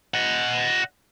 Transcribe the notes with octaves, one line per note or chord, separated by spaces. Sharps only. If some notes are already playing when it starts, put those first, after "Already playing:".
D#5 F#5